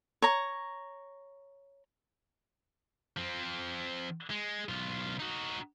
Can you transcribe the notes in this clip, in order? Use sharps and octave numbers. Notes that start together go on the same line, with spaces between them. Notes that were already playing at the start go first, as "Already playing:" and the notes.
C#5 A#5
F3 C4
G#3
B1 F4
D#4 F#4